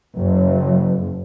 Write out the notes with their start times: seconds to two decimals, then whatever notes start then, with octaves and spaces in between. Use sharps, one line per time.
0.16 F#1